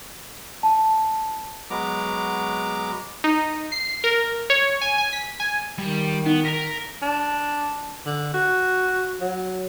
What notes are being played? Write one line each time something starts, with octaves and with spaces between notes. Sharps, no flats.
A5
F#3 G#3 B3 A#5 D6
D#4
C7
A#4
C#5
G#5
G#5
B6
G#5
D#3 G3
B3 D#4
A#4 A#5 B6
D4
D3
F#4
F#3